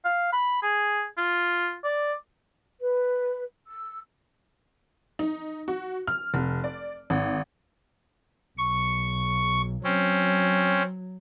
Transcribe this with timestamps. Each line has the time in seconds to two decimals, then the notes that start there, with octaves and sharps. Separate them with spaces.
0.05 F5
0.32 B5
0.63 G#4
1.17 F4
1.84 D5
2.81 B4
3.66 E6
5.19 D#4
5.68 F#4
6.07 F6
6.34 F1
6.64 D5
7.10 G#1
8.58 B1 C#6
9.84 F#3 C4 C#4